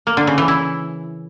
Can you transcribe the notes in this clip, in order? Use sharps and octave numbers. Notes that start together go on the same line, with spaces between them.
A#3
D3
C#3
E3
E4